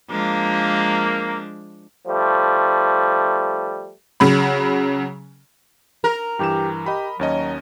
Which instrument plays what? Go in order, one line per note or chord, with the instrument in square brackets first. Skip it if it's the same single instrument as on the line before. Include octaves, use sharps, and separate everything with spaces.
[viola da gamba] F3 G#3 D4 [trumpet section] A#3
[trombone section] F3 G3 A3
[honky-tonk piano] C#3 F#3 B5
[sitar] A#4
[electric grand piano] G2 E3 E7 [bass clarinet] G4
[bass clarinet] G4 [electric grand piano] D#5 B5
[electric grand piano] D#2 C#4 D#5 [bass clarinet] F#3